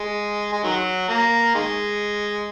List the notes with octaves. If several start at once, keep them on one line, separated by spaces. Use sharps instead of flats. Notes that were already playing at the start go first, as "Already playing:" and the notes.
Already playing: G#3
G#3
D#3 F#3
A#3
D#3 G#3